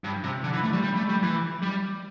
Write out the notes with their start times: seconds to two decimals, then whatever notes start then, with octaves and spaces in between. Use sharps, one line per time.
0.04 G2
0.24 C3
0.44 D3
0.53 E3
0.63 A3
0.73 G3
0.83 G3
0.96 A3
1.09 G3
1.23 E3
1.62 G3